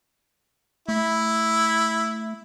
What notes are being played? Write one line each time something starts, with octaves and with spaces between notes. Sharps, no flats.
A3 E4